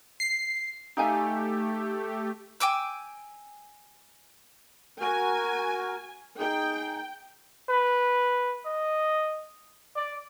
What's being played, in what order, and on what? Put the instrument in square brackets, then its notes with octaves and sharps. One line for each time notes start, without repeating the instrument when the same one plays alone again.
[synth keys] C7
[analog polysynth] A3 G4 [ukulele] D#4 F5 G#5
[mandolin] G5 G#5 D6 E6
[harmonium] F#4 A#4 [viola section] G#5
[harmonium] D#4 G#4 [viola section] G5
[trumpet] B4
D#5
D5